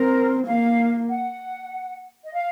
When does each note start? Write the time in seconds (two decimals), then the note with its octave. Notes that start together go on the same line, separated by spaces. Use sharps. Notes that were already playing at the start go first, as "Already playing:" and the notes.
Already playing: C4 A#4
0.47 A#3 F5
1.08 F#5
2.25 D#5
2.33 F5